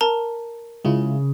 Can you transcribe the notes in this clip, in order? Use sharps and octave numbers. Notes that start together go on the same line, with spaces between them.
A#4 A5 A#5
C#3 G#3 E4 F4